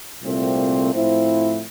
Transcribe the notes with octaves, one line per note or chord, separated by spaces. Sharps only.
C2 A#2 A3 C4
A2 F3 C4 E4